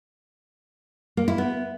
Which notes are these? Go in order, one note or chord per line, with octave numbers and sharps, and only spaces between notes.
A#3
E4
B3